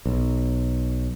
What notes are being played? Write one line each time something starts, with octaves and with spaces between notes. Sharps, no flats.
B1